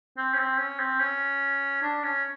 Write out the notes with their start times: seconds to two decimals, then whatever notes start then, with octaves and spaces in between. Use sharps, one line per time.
0.18 C4
0.34 C#4
0.39 C4
0.58 C#4
0.80 C4
1.00 C#4
1.83 D4
2.03 C#4